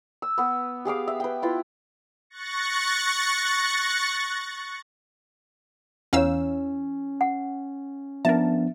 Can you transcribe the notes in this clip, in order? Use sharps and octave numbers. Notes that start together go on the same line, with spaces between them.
E6
B3 B4
G4 G#4 F5 D6
E5
B4 G5
E4 F4 B4
C#6 F#6 A6 A#6 C#7
E2 C#4 E4 C#5 F5 E6
F#5
F3 B3 D4 A#4 E5 A5